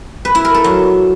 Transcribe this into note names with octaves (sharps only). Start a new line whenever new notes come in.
B4
E4
A#4
A4
F#3